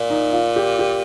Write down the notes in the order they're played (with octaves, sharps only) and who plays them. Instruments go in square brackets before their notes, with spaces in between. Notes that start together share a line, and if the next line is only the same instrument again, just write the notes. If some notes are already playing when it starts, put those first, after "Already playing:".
Already playing: [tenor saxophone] A#2
[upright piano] D#4
F4
G4
G4